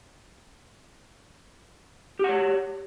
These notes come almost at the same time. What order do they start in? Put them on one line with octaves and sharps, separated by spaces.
G4 F#5 C#5